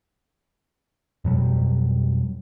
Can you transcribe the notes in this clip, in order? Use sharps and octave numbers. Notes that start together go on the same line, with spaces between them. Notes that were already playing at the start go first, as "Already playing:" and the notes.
F2 B2 F#3 G3